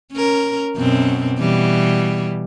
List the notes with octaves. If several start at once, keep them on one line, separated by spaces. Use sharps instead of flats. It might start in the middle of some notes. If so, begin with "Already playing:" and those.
C#4 A#4
F#2 B2 C4
B2 E3 G3